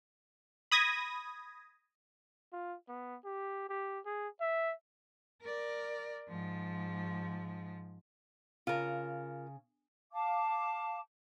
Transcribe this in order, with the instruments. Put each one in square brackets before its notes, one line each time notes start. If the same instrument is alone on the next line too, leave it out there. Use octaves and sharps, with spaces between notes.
[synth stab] B5 D#6 G#6 A#6
[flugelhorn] F4
B3
G4
G4
G#4
E5
[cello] A#4 D5
G#2 F3
[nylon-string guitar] C#3 [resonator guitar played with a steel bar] F4 A#4
[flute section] F5 A5 D6